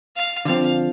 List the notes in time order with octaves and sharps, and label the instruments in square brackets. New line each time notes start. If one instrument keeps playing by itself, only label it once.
[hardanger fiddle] F5
[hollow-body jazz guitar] D3 F3 C4 [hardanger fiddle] F5